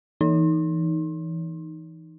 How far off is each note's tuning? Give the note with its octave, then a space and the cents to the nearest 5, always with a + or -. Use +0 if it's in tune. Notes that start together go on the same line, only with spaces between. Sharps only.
E3 +0 D#4 +0